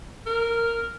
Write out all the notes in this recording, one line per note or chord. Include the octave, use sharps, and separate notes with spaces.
A#4